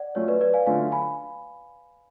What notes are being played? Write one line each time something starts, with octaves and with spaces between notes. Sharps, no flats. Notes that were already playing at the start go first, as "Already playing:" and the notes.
Already playing: D5 F#5
F#3 A3 C#4 F4 C#5
B4 D5
B4 D5
F5 G#5
D3 F#3 A3 C#4 F4 F5 G#5
G#5 B5